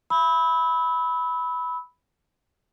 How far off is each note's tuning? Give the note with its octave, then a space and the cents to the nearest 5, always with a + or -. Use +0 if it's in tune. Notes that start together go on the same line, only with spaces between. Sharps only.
B5 +0 E6 -30